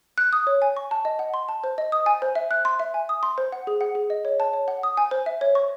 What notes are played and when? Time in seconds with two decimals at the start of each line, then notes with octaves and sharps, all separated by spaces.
0.18 F#6
0.33 D#6
0.47 C#5
0.62 G#5
0.77 C#6
0.91 A5
1.05 D#5
1.19 F#5
1.34 C6
1.49 A5
1.64 C5
1.78 D#5
1.92 D#6
2.06 G#5
2.22 C5
2.35 E5
2.51 F#6
2.65 C6
2.80 E5
2.94 G#5
3.09 D#6
3.23 C6
3.38 C5
3.52 F#5
3.67 G#4
3.81 F#5
3.95 G#4
4.10 D#5
4.25 C#5
4.40 A5
4.53 C#5
4.68 F#5
4.83 D#6
4.97 G#5
5.11 C5
5.26 E5
5.41 C#5
5.55 C#6